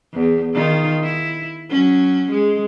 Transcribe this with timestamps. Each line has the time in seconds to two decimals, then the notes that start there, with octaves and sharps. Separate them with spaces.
0.13 E2
0.54 D#3 D#4 F4
1.03 E4
1.70 F#3 C#4
2.31 G#3